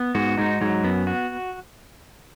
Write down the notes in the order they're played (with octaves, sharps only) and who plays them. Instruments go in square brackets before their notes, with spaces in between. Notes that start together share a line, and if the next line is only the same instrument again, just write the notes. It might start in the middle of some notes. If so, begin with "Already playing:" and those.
Already playing: [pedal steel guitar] B3
[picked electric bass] G#2 [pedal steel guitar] F#4
[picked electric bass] G#2 [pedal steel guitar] D#4
[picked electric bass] G#2 [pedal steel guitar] F#3
[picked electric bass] F#2 [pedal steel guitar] B3
[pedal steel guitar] F#4